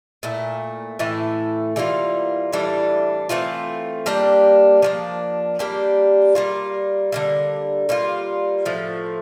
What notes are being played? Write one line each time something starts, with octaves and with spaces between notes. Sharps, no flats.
A#2 A3 E4
A2 E3 A3 E4
E3 G3 A#3 F4
A2 E3 G3 D4
E3 A3 C4 F4
G3 A#3 D4 G4
F3 A#3 D4
G3 A#3 D4 G4
G3 A#3 F4
D3 G3 A#3
G3 A#3 F4
A2 F3 A3